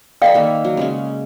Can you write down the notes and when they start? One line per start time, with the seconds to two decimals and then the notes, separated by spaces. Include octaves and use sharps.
0.22 A4 D5 D#5 F5 G5 B5
0.34 D#3 A#3 E5
0.65 F#3
0.77 C#3 G#3 C#4